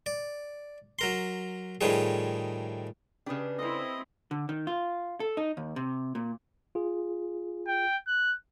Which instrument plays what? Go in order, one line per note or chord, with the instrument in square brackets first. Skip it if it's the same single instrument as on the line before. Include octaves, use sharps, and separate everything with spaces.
[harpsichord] D5
F#3 A#4 C6
A2 D#3 F3 G3 G#4
[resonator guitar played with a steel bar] C#3 D4 [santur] G4 B4 D#5
[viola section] C4 E4 [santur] A4 C5 [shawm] D#5
[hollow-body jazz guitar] D3
D#3
F4
A4
D#4
D#2
C3
A#2
[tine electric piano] F4 G#4
[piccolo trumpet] G5
F#6